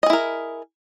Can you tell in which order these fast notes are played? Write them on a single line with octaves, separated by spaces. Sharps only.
D#5 G#4 E4 A#4